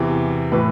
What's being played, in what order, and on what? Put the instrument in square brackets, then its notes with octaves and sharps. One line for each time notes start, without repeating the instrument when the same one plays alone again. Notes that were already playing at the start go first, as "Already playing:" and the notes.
Already playing: [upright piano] E2 C3 E3
A2 E3 B4